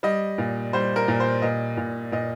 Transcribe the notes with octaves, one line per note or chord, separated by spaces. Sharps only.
G3 D#5
A#2
G3 C5
A#4
A#2
C5
A#2 D#5
A#2
A#2 D#5